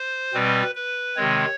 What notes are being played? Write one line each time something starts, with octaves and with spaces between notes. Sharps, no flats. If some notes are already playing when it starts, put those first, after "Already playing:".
Already playing: C5
B2 G3 C4 B4
B4
C3 D#3 G#3 C4 C#5